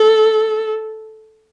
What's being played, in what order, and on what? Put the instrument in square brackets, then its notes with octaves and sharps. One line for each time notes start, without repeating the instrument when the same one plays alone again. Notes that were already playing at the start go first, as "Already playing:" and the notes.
Already playing: [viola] A4